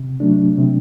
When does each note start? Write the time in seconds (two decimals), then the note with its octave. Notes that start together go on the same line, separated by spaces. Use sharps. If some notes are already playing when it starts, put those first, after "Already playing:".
Already playing: C3
0.20 F#3 A3 D4
0.58 C3